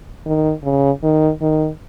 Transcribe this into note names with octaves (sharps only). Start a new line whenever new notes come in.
D#3
C#3
D#3
D#3